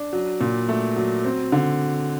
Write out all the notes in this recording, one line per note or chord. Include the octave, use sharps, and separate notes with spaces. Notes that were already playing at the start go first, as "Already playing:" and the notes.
Already playing: D4
F#3
A#2
A3
F#3
C4
D3